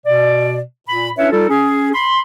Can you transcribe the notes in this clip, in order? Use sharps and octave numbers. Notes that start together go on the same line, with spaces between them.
B2 D5
A#2 B5
C#4 D4 E4 B4 C#5 E5
G3 D#4 F4 A4
C#4 G#4
B5 C6